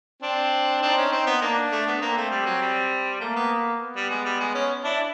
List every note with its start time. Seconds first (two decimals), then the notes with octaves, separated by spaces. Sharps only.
0.22 C4 D4
0.81 C4 D4 D#4
0.97 C#4
1.12 C4
1.27 B3
1.42 A#3 D4
1.72 A3
1.87 B3
2.01 A#3 C4
2.17 A3
2.31 G3
2.46 F#3
2.62 G3
3.20 A3 A#3
3.36 B3
3.80 B3
3.96 G3
4.10 G#3
4.25 G3
4.40 G#3
4.54 C#4
4.84 D4 E4